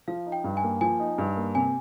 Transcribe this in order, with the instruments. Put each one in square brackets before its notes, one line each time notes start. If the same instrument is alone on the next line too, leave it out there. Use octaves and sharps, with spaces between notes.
[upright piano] F3 [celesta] F5
[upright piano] D#4
[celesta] G5
[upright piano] G2
[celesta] G#5
[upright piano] A#3
[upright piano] F3 [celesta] G#5
[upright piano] D#4
G2
A#3
[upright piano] C3 [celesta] G#5